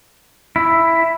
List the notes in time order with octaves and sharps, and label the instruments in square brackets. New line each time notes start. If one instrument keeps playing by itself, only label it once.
[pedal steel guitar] E4